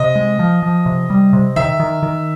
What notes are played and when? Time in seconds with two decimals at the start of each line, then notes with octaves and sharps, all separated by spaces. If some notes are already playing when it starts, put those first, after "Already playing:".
Already playing: C3 D#5
0.15 G#3
0.39 F3
0.63 F3
0.86 C3
1.10 G3
1.33 C3
1.56 D#3 E5
1.80 D#3
2.03 D#3